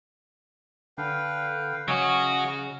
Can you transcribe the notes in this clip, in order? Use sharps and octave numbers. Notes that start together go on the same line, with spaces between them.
D3 B4 F5 G5
C#3 F#3 C#4 F#4 D#5